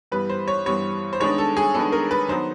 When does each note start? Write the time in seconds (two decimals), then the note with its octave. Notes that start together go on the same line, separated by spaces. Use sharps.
0.12 G2 E3 G3 B3 B4
0.29 C5
0.48 C#5
0.66 G2 E3 G3 B3 C#5
1.13 C5
1.20 D#3 G#3 B3 D4 C#5
1.38 A4
1.57 G#4
1.74 D#3 G#3 B3 D4 A4
1.92 A#4
2.11 B4
2.28 D#3 F#3 B3 C5